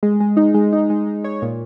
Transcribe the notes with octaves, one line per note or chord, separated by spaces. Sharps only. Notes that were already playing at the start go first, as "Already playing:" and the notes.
G#3
G#3
D#4
G#3
D#4
G#3
G#3
C#5
A#2